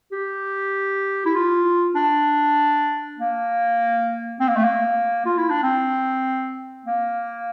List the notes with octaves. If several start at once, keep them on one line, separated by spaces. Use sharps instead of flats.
G4
E4
F4
D4
A#3
C4
A#3
A3
A#3
F4
E4
D4
C4
A#3